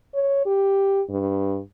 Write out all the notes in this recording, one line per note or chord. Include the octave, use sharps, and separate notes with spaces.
C#5
G4
G2